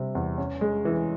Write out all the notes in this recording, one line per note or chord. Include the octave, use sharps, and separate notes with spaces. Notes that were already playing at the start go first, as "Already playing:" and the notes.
Already playing: C3 G3 C4
E2
C#4
G#3
E3